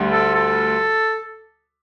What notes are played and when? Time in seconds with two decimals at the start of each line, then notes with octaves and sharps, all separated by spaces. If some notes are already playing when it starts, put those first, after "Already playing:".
Already playing: D2 D3 G3
0.12 A4
0.35 A4